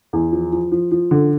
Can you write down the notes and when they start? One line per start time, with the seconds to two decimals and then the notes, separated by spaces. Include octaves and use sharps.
0.13 E2
0.32 F3
0.52 F3
0.72 F3
0.92 F3
1.11 D3